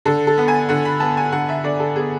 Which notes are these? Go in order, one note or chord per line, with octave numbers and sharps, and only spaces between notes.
D3 A4
A4
B3
G#5
D3 F#5
B5
B3 A5
G#5
D3 F#5
E5
D3 D5
A4
B3 G#4